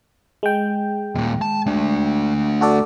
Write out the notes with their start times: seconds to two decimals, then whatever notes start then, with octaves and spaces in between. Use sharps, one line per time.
0.43 G#3 G5
1.15 D#2 A#2
1.42 A5
1.66 A3 D4
2.61 F#4 A4 D5